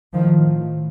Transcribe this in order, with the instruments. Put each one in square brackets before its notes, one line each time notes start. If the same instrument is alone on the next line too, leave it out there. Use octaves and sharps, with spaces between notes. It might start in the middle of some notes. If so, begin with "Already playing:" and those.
[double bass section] A2 D#3 F3